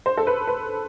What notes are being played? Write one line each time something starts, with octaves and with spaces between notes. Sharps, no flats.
C5
A4
B4
B4